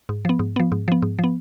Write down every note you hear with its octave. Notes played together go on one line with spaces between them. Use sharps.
G#2
F3 B3
G#2
F3 B3
G#2
F3 B3
G#2
F3 B3